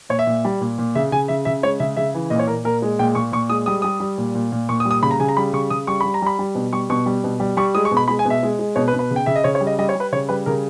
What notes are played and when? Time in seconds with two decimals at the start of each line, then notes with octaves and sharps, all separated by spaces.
0.10 A#2 C#5
0.19 E5
0.27 A#2
0.45 G3
0.61 A#2
0.79 A#2
0.95 C#3 E5
1.12 C#3 G#5
1.28 C#3 E5
1.45 C#3 E5
1.63 G#3 C#5
1.80 C#3 E5
1.97 C#3 E5
2.14 E3
2.30 A#2 D#5
2.39 C#5
2.47 A#2 A#4
2.64 A#2 A#4
2.82 G#3
2.99 A#2 G5
3.15 A#2 C#6
3.32 A#2 C#6
3.49 G#3 D#6
3.66 G3 D#6
3.82 G3 D#6
4.00 G3
4.18 A#2
4.35 A#2
4.52 A#2
4.69 A#2 C#6
4.80 D#6
4.85 G3
4.91 D#6
5.02 C#3 B5
5.11 A#5
5.20 C#3 G#5
5.29 A#5
5.37 G3 B5
5.53 C#3 C#6
5.70 C#3 D#6
5.87 G3 C#6
6.01 G3 B5
6.14 A#5
6.22 G3 B5
6.39 G3
6.55 B2
6.73 G3 C#6
6.90 B2 C#6
7.06 G3
7.24 B2
7.40 G3
7.57 G3 C#6
7.75 G#3 D#6
7.85 C#6
7.91 B2
7.97 B5
8.08 G#3 B5
8.19 G#5
8.25 B2
8.30 E5
8.43 G#3
8.59 G#3
8.76 B2 C#5
8.88 B4
8.94 B2
8.99 B4
9.11 C#3
9.16 G5
9.26 C#3 E5
9.36 D#5
9.44 C#3 C#5
9.55 C#5
9.61 G3
9.67 D#5
9.79 G3 D#5
9.89 C#5
9.95 G3 B4
10.12 C#3 C#5
10.29 G3 B4
10.46 C#3 A#4